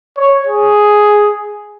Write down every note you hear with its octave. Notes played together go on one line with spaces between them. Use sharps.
C#5
G#4